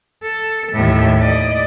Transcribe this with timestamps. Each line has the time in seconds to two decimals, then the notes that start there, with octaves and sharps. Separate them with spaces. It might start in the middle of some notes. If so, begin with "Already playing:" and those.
0.23 A4
0.73 D#2 A2
1.22 D5 D#5